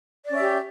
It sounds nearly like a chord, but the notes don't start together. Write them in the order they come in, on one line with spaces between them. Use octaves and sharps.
D5 C#4 E5 G4